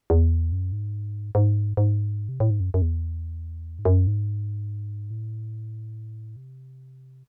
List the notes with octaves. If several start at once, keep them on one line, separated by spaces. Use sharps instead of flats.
E2
F#2
G#2
G#2
G#2
C3
A2
G#2
F#2
F#2
E2
G#2
F#2
G#2
A2
C3